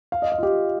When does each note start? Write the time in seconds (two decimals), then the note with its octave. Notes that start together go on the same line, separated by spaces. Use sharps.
0.12 F5
0.22 D#5
0.32 F5
0.38 F4
0.43 G4